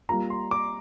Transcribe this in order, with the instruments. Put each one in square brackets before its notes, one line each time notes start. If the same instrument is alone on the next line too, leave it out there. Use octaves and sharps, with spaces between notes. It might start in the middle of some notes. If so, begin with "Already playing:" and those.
[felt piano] G3 A#3 F4 [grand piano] A#5
[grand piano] C6
D6